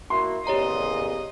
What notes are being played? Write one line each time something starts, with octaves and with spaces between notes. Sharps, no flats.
A#3 E4 F#4 C6
E2 A#2 C#3 G4 C#5 D#5 A#5